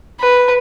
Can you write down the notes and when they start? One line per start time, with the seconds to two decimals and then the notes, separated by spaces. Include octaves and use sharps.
0.20 B4